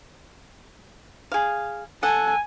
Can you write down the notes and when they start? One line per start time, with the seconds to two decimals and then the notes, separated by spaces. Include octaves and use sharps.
1.32 G#4 F5
2.03 A4 F#5 G#5